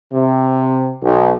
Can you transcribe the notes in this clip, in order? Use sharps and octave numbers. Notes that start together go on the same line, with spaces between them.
C3
B1